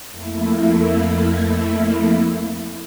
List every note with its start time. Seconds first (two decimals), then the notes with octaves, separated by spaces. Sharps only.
0.11 F2 A3 A#3 E4